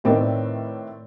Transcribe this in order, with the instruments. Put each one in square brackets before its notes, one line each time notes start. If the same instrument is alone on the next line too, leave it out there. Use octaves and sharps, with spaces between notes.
[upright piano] A2 D#3 C4 B4 D5 D#5